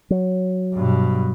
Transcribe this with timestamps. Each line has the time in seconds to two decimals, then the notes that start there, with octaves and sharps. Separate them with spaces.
0.10 F#3
0.73 G2 B2